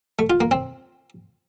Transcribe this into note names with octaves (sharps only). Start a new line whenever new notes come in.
A3
F4
A#3
C4